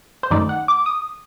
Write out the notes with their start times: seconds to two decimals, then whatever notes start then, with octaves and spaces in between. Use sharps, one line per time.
0.23 C5
0.31 F#2 D#3 A3 D#4 D5
0.49 F#5
0.68 D6
0.86 D#6